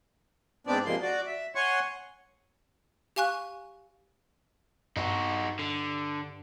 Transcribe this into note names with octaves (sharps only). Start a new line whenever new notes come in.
G#2 B3 C4 D4 D5
C3 F3 G#3 A#3 C6
F#4 D5
E5
C#5 F#5 G#5 C6 C#6
G4 F5 G#5 C#6 F#6
G2 D#4 F#4
D3